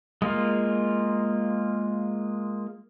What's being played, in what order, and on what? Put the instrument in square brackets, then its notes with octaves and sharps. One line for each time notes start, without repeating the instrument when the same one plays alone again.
[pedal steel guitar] G#3 A#3 F4